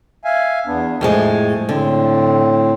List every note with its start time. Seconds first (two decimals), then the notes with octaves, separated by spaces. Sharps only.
0.25 E5 F5 G#5
0.67 E2 B3 D4
1.01 F2 A2 G#3 A3
1.69 A2 D3 C4